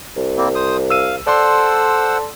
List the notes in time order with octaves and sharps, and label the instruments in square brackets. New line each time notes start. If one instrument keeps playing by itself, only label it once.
[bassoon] C2
[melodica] G3 A#3 C4
C5 D#6
[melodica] F5 [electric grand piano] E6 D#7
[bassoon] A4 [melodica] C5 F#5 E6 [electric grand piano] D5 C6